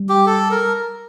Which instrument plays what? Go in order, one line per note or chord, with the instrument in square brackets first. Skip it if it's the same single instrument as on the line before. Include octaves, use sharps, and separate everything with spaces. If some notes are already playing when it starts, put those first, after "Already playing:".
Already playing: [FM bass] G3
[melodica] G4
A4
A#4